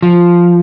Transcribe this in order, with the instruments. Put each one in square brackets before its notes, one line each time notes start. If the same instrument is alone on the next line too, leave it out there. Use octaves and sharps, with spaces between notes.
[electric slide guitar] F3